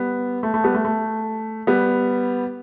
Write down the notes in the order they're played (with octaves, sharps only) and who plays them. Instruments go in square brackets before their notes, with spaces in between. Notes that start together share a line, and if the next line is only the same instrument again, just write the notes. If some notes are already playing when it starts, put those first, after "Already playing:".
Already playing: [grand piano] G3 B3
A3
A3
G3 B3
A3
A3
G3 B3